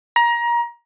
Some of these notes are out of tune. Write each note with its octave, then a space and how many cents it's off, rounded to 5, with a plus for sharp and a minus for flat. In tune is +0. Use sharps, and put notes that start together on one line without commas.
A#5 +25